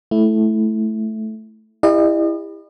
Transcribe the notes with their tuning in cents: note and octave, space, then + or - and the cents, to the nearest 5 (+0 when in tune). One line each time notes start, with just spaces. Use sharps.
A3 -10 E4 +0
E4 +0 G4 +35 D#5 -45